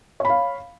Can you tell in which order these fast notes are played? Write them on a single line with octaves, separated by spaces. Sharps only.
C#5 B5 F5